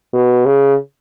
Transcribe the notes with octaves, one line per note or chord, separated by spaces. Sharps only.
B2
C#3